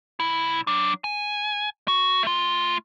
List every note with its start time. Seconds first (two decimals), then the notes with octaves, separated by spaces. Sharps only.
0.20 B1 E4
0.67 F#3 D4
1.04 G#5
1.88 F#4
2.23 A3 F4